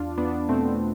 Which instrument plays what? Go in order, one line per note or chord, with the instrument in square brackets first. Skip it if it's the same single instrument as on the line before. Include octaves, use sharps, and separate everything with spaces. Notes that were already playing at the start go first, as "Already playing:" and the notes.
Already playing: [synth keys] E2 D4 F4
E2 B3 D4
B2 A3 C4